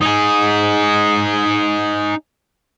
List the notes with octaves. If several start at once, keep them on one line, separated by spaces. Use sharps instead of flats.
D#4 G#4